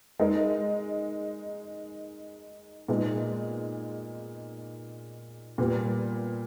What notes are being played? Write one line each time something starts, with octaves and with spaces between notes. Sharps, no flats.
G#3 D#4 A#4
A#2 G#3 B3 D#4
A#2 G3 B3